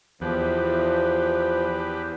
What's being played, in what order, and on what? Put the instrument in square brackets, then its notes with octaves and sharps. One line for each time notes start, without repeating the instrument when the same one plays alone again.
[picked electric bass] E2 [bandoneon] F3 [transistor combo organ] G4 B4